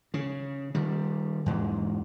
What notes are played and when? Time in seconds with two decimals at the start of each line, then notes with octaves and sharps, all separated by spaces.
0.14 C#3
0.75 D#3 G3
1.46 E2 G#2